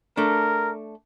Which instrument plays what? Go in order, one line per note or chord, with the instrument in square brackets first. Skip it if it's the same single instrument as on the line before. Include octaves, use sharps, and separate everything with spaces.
[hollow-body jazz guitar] A3 D4 [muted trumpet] A#4